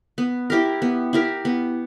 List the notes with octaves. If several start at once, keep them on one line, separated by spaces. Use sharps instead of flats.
B3
E4 G4 A#4
B3
E4 G4 A#4
B3